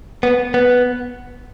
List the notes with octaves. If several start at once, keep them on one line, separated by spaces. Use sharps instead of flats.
B3
B3